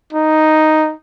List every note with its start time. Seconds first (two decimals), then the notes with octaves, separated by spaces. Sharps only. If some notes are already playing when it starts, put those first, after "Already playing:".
0.13 D#4